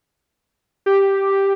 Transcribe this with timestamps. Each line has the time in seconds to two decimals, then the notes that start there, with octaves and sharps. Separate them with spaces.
0.86 G4